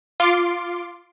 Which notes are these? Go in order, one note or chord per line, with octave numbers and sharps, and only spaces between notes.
F4 C6 D6